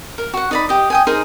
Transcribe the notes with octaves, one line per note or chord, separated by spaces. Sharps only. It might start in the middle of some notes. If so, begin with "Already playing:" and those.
A#4
F#4 F#5
D#4 D5 B5
G4 D#5
D#5 G5 G#5
D#4 G#4 A#4 C5